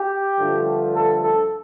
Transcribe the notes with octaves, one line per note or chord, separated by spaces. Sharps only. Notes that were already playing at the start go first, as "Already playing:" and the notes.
Already playing: G4
G2 D3 F3 A3
A4
A4